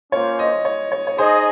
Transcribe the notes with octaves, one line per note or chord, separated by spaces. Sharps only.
A#3 C#4 F4 C5 C#5
D#5
C#5
C#5
C#5
D#4 G#4 C5 D#5